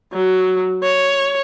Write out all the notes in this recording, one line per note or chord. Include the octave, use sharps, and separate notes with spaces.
F#3
C#5